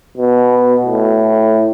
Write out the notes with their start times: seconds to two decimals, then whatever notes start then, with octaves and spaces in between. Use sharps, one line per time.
0.17 B2
0.85 A2